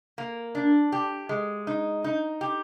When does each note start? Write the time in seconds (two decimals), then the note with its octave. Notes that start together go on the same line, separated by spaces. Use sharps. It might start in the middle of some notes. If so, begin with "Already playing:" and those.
0.18 A#3
0.55 D4
0.92 G4
1.29 G#3
1.67 D#4
2.04 D#4
2.41 G4